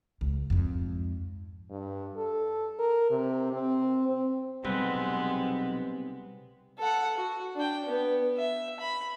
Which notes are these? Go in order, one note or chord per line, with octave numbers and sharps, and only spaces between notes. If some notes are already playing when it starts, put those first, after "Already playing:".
C#2
F2 G#2
G2
A4
A#4
C3
C4
C4
B1 C3 G3 G#3 B3 C4 B4
A4 F#5
F#4
D4 G5
B3
E5
B5